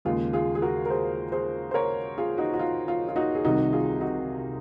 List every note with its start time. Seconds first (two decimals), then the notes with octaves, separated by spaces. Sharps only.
0.05 D#2 C#3 G#3 F4 G#4
0.33 F4 G#4
0.55 G#4
0.62 F#4 A#4
0.86 A#4
0.90 G#4 C5
1.32 G#4 C5
1.71 C5
1.74 A#4 C#5
2.18 F4 G#4
2.38 D#4 F#4
2.54 F#4
2.59 F4
2.88 F4
3.09 F4
3.16 D#4 F#4
3.35 G#4
3.44 C2 C3 D#3 D#4 F#4
3.73 F4 G#4
4.01 D#4 F#4